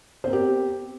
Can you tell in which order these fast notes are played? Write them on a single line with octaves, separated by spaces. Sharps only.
C5 C4 A#4 G4 B3